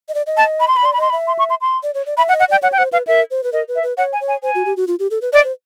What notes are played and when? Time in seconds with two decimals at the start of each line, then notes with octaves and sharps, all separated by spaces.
0.09 D#5
0.14 D5
0.26 D#5
0.37 A5
0.60 B5
0.68 C6
0.77 B5
0.83 D5 C6
0.93 B5
0.97 D#5 C6
1.10 E5 B5
1.27 C6
1.39 C#6
1.50 C6
1.61 C6
1.83 D5
1.94 C#5
2.06 D5
2.17 E5 B5
2.29 F#5
2.32 D#5
2.40 F#5
2.48 D5 G5
2.62 C#5 F#5
2.72 G5
2.78 C5 F#5
2.92 B4 F5
3.07 A#4 E5
3.31 C5
3.44 B4
3.53 A#4 D#5
3.68 B4
3.76 E5
3.83 B4
3.97 C#5 F#5
4.13 G#5
4.21 C#5
4.28 G#5
4.43 C5 G#5
4.55 F#4
4.66 G4
4.77 F#4
4.88 F4
4.99 G4
5.11 A4
5.22 B4
5.33 D5 D#5
5.44 C5